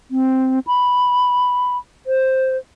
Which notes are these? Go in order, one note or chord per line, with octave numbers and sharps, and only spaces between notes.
C4
B5
C5